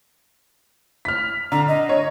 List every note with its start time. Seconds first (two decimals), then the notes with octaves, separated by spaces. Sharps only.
1.05 F6 B6
1.52 D3 A#5
1.68 D#5
1.89 C#5